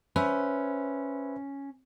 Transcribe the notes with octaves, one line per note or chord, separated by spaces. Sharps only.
C#4 B4 C5 E5